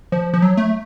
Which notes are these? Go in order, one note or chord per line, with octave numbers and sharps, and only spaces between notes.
F3
F3
F#3
A3